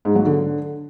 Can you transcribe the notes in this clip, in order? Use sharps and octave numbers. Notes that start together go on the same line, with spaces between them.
G#2
F#3
D3